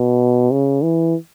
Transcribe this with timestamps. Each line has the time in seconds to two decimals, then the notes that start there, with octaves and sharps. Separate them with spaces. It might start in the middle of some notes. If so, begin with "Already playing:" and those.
Already playing: B2
0.52 C#3
0.83 E3